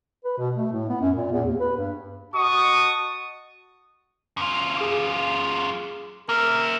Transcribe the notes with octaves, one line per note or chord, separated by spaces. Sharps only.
B4
B2
A3
A2
B3
F#2
A#2
E2
D#2
B4
G2
F#4 D#5 A5 C#6 D#6
F#2 F4
G#4 D6
A#3 A#4 E5